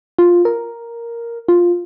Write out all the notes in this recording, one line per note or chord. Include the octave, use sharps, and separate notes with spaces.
F4
A#4
F4